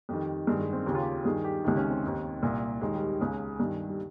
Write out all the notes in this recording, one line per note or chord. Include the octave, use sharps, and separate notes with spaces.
F2 D#3 G3
G2 D#3 G#3
G#3
C4
D#2 C#3 G4
F4
G4
G2 D#3 G#4
G4
C#2 C3 D#3 G4
C#4
C4
D#2 D#3
C2 A#2
D#2 D#3 G#3
G3
C#2 C#3
G2 D#3
G3